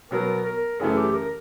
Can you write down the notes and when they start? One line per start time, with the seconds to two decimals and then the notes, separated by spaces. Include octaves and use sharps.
0.11 B2 F#3 B3 A#4
0.46 A#4
0.80 F#2 C#3 E3 A3 G#4
0.97 G4
1.14 A#4